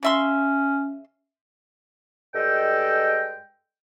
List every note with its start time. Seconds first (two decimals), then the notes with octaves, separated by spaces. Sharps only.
0.03 C#3 C#4 E5 C6
2.35 G2 G#3 A4 D#5 G5